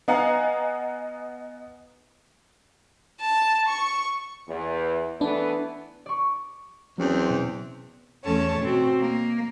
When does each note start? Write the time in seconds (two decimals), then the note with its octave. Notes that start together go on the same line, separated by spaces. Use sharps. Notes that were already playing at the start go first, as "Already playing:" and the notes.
0.08 B3 D#5 F5 F#5 G#5 A#5
3.21 A5
3.68 C#6
4.49 E2
5.21 E3 A3 B3 D4
6.06 D5 C#6
6.98 E2 F#3 C4 C#4
7.30 B2
8.23 E2 A3 C#4 A4 C#5 A5
8.61 B2 C4 F#4
9.00 A#3